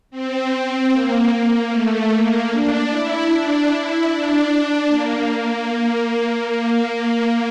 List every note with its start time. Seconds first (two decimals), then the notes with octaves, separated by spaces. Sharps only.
0.11 C4
0.91 A#3
1.70 A3
2.10 A#3
2.50 D4
2.90 E4
3.30 D4
3.69 E4
4.09 D4
4.88 A#3
6.48 A#3